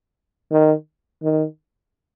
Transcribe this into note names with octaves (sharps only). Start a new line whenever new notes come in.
D#3
D#3